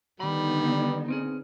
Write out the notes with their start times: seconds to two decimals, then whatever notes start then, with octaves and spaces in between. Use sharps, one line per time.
0.20 D3 D#3 G3 B3 D#4 B5
1.08 C4 C#4 G#4